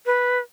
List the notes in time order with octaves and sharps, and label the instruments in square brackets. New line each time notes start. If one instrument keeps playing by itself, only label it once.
[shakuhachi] B4